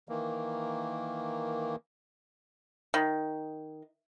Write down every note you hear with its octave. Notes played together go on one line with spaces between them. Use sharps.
D#3 E3 A#3
D#3